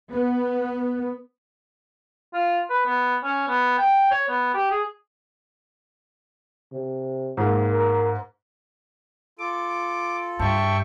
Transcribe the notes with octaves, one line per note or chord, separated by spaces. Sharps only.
B3
F4
B4
B3
C#4
B3
G5
C#5
B3
G4
G#4
C3
G#2 A#3
A#4
F4 A4 D6
G2 E5 G5 A5 C#6